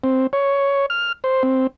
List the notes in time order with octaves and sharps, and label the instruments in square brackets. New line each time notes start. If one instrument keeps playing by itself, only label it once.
[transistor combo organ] C4
C#5
F6
C5
C4